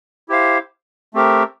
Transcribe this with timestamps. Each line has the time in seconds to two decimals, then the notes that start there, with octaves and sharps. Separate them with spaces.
0.28 E4 G4 C5 F5
1.14 A3 C4 G4 A#4